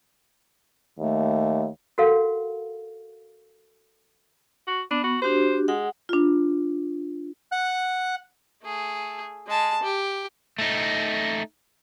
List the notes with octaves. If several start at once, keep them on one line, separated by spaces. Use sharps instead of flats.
D#2 A3
F#4 A4 A#4 F5 F#5
F#4
B3 D4
F#4
D4 F#4 G4 C5
G#3 F#5
D4 F4
F#5 F#6
A3 G#4
G#3 A5
G4
A3 D#4